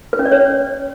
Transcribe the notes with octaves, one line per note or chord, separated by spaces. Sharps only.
B4
C#4
D5
C#5